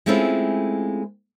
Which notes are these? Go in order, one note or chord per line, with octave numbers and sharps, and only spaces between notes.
G#3 A3 C4 C#4 E4 F4